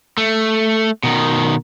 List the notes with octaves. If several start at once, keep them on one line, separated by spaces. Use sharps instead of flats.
A3
B2 D#3